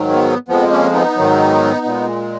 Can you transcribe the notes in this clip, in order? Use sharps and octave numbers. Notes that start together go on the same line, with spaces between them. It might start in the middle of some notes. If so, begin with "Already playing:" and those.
Already playing: G#2 D#3 F#3
B3
F2 F3 G#3 B3
A#3 C#4
B3 D#4
G#2 D#3 F#3
A#2 G#3